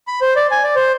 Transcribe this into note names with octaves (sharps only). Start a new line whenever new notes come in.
B5
C5
D5
G#5
D5
C5